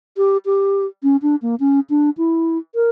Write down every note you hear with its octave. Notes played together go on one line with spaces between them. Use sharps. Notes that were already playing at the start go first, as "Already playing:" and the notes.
G4
G4
C#4
D4
A#3
C#4
D4
E4
A#4